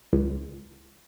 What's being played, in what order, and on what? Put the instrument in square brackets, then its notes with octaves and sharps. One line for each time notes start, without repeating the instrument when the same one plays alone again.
[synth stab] C#2